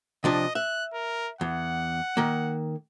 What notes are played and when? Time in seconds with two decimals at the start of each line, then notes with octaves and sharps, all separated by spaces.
0.24 C3 F3 D4 D#5
0.55 E5 F#6
0.93 A#4
1.41 E2 F#5
2.17 D#3 A#3